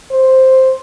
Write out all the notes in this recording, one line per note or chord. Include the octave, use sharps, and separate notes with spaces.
C5